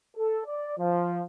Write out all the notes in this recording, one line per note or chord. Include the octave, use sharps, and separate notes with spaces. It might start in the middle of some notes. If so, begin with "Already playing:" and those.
A4
D5
F3